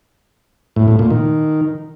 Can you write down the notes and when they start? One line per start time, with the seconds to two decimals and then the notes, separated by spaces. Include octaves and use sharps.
0.76 A2
0.88 A2
0.99 A#2
1.10 D#3